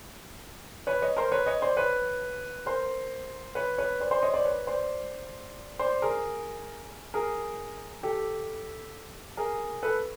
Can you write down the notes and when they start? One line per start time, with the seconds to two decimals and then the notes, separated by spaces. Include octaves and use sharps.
0.87 B4 C#5
1.02 C#5 D#5
1.17 A#4 C5
1.32 B4 C#5
1.46 C#5 D#5
1.62 C5 D5
1.77 B4 C#5
2.66 A#4 C5
3.55 B4 C#5
3.78 B4 C#5
4.00 C5 D5
4.11 C5 D5
4.22 C#5 D#5
4.34 C5 D5
4.45 B4 C#5
4.67 C5 D5
5.79 C5 D5
6.02 G#4 A#4
7.14 G#4 A#4
8.03 G4 A4
9.37 G#4 A#4
9.83 A4 B4